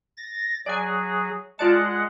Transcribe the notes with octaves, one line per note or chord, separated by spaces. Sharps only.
A6 A#6
F#3 G#4 D5 G#5
G#3 F4 D5 F#5 A5